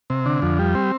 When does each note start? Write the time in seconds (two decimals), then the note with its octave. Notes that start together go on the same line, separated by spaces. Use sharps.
0.10 C3
0.26 D3
0.42 F2
0.59 G3
0.75 C4